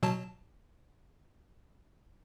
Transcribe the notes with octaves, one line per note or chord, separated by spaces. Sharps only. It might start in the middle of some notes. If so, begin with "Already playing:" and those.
B2 F#3 A5